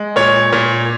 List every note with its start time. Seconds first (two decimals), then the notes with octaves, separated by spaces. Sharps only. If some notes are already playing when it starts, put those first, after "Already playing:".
Already playing: G#3
0.16 A#2 C#5
0.53 A#2